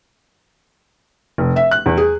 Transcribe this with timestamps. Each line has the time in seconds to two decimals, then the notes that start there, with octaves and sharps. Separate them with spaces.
1.38 F1
1.56 E5
1.71 F#6
1.86 E2
1.98 G#4